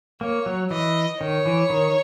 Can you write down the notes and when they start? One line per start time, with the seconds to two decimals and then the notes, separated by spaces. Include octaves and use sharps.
0.21 A#3 C#5
0.46 F#3
0.70 E3 D#5
1.21 D#3 C#5
1.46 E3
1.70 D#3